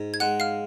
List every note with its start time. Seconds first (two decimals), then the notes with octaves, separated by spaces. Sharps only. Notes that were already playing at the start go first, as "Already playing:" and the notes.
Already playing: G#2
0.14 G#6
0.20 G#3 F#5 F#6
0.40 F5 F6